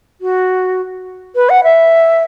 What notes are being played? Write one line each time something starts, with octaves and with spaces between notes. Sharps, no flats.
F#4
B4
F#5
E5